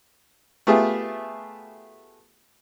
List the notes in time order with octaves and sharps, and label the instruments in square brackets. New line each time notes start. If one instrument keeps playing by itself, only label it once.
[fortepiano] A3 B3 F4 G4 G#4 E5